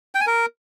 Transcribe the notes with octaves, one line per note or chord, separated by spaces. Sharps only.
G5
G#5
A#4